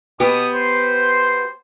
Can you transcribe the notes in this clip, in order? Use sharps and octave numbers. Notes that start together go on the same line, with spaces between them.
B2 B3 G4 D#6
C5